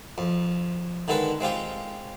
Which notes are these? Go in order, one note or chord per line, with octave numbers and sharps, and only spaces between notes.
F2
D3 D#3 G#3 A4 B4
G#3 C4 F4 G4